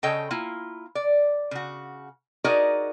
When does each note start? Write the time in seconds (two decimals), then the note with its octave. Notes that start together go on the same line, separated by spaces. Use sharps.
0.03 C#3 A4 C#5 D#5 G5
0.31 A#3 E4 F4
0.95 D5
1.51 C#3 F#4
2.44 D#4 F#4 G#4 A#4 D5 D#5